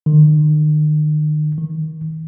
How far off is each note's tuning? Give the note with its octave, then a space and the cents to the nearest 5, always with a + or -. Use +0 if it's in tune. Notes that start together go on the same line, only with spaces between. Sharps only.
D#3 -40
D#3 +20